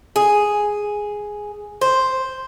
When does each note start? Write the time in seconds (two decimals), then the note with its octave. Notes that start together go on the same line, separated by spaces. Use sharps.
0.16 G#4
1.81 C5